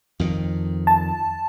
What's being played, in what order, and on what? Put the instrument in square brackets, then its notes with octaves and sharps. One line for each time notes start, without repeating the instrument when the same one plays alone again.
[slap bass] F2 D#3
[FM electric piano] A5